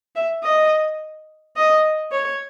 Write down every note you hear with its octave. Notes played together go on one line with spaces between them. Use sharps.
E5
D#5
D#5
C#5